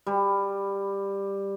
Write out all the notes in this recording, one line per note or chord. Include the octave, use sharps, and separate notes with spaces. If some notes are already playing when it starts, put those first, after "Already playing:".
G3